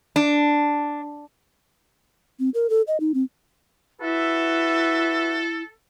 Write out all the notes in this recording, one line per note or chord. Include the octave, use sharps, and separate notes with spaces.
D4
C4
A#4
A4
D#5
D#4
C4
E4 F#4 A4 B4 E5